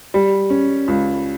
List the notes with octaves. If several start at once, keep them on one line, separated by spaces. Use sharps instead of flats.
G3
C#4
C#2